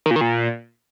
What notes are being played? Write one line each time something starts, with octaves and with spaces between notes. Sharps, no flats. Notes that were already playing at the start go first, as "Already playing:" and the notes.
D#3
A#2
D#3
A#2